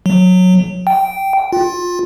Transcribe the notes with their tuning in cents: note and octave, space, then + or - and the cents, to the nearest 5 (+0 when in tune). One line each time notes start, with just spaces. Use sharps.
F#3 -15
G5 -10
F4 +20